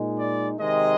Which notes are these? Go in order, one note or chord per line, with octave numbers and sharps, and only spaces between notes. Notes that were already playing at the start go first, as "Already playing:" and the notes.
Already playing: A#2 G#3 D#4
D5
C3 D#3 G#3 D#5